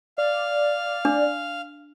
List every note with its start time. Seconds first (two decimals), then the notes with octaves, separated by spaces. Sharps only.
0.18 D5 F5
1.05 D4